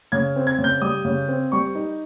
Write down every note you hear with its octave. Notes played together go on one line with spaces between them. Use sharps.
C#3 G#6
C4
G#6
C#3
G6
G3 D#6
C#3
C4
G3 C#6
D#4